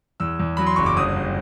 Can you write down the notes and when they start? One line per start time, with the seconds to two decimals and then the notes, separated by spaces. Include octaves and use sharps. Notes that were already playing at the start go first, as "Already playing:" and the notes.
0.20 E2 E6
0.40 E2
0.57 F#3 B5
0.66 C6
0.76 F#1 C#6
0.86 D6
0.96 G1 D#6
1.16 G1